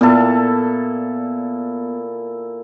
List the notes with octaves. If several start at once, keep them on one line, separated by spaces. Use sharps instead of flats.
A#2 B3 E4 A4